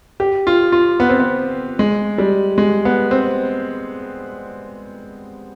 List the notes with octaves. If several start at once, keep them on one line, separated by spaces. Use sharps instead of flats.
G4
F4
F4
B3
C4
B3
G#3
G3
G#3
B3
C4